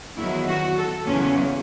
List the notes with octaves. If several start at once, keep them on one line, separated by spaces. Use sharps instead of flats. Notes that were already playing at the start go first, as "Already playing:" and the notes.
E2 D#3 F#3 E4
F#4
A4
E2 C#3 F#3 C#4